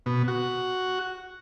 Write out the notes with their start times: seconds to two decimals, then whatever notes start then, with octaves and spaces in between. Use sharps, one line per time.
0.06 B2
0.28 F#4